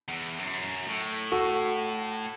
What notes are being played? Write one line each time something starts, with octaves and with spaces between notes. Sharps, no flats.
E2
F#2
A2
F#4 A4